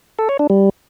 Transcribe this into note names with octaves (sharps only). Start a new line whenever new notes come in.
A4
C#5
D4
G3